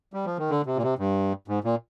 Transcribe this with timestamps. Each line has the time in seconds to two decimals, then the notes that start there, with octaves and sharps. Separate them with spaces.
0.13 G3
0.25 F3
0.38 D#3
0.50 D3
0.66 C3
0.77 A#2
0.83 C3
0.99 G2
1.48 G#2
1.64 A#2